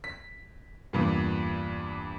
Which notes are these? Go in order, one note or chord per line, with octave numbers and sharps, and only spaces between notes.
B6
E2 G2 A#2